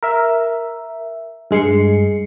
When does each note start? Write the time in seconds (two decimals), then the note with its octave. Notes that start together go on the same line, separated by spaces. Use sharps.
0.03 A#4 E5
1.51 G2 G#3 C7 C#7